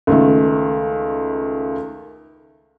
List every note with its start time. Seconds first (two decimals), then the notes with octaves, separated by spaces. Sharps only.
0.07 C#2 D#3 A3